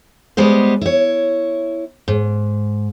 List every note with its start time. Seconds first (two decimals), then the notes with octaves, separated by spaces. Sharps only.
0.37 G3 G#3 B3 C5
0.81 E4 C#5
2.08 G#2